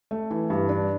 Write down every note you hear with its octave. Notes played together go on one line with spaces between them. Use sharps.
A3
E3
G2
D4